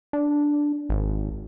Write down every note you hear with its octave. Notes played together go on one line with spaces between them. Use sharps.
D4
G#1